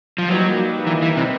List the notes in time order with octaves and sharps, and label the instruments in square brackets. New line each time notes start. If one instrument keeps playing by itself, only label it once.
[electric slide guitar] F3
[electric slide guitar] F#3 [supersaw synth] G3 A#3 D#4 G4 B4
[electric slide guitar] E3
E3
C3